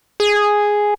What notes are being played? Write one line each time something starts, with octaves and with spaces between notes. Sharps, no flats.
G#4